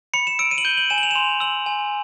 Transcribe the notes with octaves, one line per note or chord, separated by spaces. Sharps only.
B5 C#7
E7
E6 D7
D#7
F#7
G6 G7
F#7
G#5 E7
F#7
F7
E7
C6 F7
E6 F#7
G#5